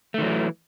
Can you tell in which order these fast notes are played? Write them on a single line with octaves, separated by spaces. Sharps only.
A3 D#3 F#3 E3